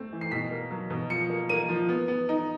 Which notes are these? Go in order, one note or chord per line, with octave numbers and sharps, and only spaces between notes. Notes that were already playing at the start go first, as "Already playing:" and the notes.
Already playing: A3 C4
E3
C7
B2 B6
A#3
F#3
B2
F3 C#7
A#3
A#3 D#7
F3
B3
B3
D#4